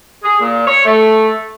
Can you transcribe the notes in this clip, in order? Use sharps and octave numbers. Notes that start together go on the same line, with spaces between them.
G#4
A#2
C#5
A3